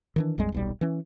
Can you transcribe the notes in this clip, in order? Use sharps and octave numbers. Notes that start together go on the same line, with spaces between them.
D#3 E3 D4
A#1 F2 G3 G#3
D#1 B1 G3
E3 C#4